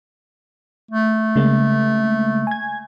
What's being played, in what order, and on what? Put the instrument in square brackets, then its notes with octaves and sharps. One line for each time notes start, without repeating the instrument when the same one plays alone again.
[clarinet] A3
[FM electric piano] C#3 G#3 A#3
G#5 G#6